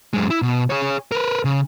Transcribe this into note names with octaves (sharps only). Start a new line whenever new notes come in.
F#2 G#3
E4
B2
G#4 C#5
A#4 B4
C#3